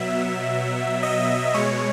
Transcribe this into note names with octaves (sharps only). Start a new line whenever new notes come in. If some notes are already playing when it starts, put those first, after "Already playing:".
Already playing: B2 F#3 E5
D#5
B2 G#3 C#5